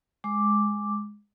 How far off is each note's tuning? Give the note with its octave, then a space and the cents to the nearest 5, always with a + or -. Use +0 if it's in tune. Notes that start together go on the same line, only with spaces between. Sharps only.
G#3 +0 D6 +0